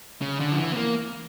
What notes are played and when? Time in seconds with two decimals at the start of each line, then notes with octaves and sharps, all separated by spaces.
0.22 C#3
0.40 D3
0.52 F3
0.58 E3
0.72 B3
0.77 A#3